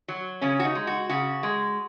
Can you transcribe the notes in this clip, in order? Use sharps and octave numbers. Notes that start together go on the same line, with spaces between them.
F#3
C#3 C#4
F#4
D#4
G#3
F#4
C#3 F#4
G#3